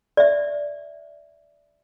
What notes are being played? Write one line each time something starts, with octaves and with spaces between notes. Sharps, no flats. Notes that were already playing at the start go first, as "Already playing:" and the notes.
D5 E5